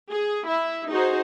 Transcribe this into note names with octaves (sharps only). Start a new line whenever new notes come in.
G#4
E4 E5
D#4 F#4 G#4 C5